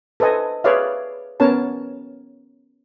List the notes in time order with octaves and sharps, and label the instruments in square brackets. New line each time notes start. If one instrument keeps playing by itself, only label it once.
[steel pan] A4 B4 C5 D#5 G#5
G#4 B4 C#5 D5 E5 F5
B3 C#4 A#4 C#5 A5